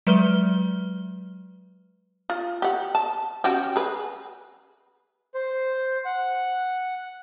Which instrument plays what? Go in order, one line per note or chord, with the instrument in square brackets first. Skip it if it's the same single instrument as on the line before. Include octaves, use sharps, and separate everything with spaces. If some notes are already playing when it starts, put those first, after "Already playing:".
[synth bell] F#3 G#3 B4 F6 G7
[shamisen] F4
G4 F#5
A5
C#4 F#4 G4
G#4 B4
[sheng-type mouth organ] C5
F#5